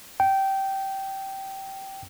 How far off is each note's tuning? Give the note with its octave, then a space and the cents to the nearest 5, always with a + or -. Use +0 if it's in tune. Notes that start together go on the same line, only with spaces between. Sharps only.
G5 -15